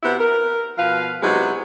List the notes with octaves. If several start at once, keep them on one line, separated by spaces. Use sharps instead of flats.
C3 B3 E4 F#4
A#4
B2 F3 B4 F5
C3 F#3 G#3 B3 D#4 E4